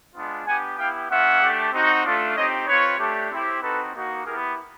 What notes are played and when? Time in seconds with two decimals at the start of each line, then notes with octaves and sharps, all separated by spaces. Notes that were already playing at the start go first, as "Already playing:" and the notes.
0.15 G#3 B3 D4 F4
0.47 B3 D4 G4 F#5 G#5
0.78 B3 E4 G4 F5 G5
1.10 A#3 C#4 F4 E5 F#5
1.42 A3 D4 G4
1.72 C4 D#4 F#4
2.05 A3 D4 F4
2.36 C4 D#4 G4 C#5 D#5
2.68 C4 F4 B4 C#5
2.99 A3 D4 G4
3.30 C4 E4 G4
3.62 C4 D#4 F#4 A4 B4
3.94 A#3 D#4 F#4
4.25 B3 E4 G4 G#4 A#4